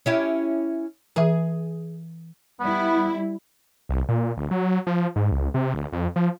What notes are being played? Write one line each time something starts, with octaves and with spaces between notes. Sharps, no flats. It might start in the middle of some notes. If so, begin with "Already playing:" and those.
C#4 E4 G4
E3 G#4 E5
G3 B3 E4
C2
A#2
D2
F#3
F3
G#2
C#2
C3
D2
F2
F3